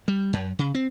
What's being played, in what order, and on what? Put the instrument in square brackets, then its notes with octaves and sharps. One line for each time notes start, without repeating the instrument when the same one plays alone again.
[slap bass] G3
F#2
C#3
C4